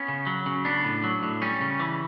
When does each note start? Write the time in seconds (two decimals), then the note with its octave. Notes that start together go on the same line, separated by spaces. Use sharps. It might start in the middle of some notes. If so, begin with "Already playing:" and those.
Already playing: B3 C#4
0.08 C#3
0.27 F#3
0.46 C#3
0.65 B3 D4
0.85 A2
1.04 F#3
1.23 A2
1.42 G3 C#4
1.61 C#3
1.80 E3